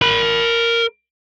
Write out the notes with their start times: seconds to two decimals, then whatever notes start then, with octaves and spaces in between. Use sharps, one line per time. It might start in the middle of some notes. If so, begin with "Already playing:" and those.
0.02 A#4 B5